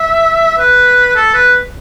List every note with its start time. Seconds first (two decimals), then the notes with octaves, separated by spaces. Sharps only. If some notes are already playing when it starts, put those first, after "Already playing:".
Already playing: E5
0.59 B4
1.16 A4
1.34 B4